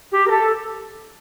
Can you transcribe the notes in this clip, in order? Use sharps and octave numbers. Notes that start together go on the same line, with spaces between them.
G4
A#4
A4